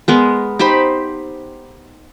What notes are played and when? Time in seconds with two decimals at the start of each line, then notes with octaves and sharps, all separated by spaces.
0.08 G#3 B3 A#4
0.59 D#4 G4 C5 B5